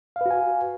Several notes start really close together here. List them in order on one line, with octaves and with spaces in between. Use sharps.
F5 B4 F#4 G#5